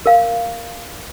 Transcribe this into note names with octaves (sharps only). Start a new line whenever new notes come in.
A#4 F5